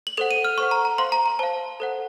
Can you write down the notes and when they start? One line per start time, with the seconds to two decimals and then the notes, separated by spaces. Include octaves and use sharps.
0.07 F#7
0.17 A4 C5 F#5 F7
0.31 D#7
0.44 F6
0.58 A4 C5 F#5 C#6
0.71 A#5
0.85 A#5
0.98 C5 F5 C6
1.12 A#5
1.26 A#5
1.39 C5 F5 A5
1.80 A4 C5 F#5